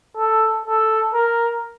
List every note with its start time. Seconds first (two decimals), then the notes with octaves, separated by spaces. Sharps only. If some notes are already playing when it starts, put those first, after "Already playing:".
0.17 A4
0.66 A4
1.14 A#4